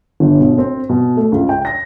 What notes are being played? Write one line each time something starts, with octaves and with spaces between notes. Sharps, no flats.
G1
B2
C4
B2
A3
C#2
G5
A#6